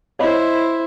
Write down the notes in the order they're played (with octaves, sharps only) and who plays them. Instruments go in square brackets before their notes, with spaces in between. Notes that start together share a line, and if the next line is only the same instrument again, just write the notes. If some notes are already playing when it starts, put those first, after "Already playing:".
[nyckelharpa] E4 C5 [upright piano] C#5 D#5 B5